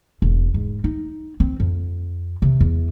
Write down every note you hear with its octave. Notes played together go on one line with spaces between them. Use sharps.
E1
G#2
D#4
C4
F2
C3
E2